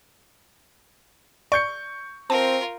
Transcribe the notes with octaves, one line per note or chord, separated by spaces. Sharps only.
D5 C#6 G6 C#7
C4 F4 A#4 A5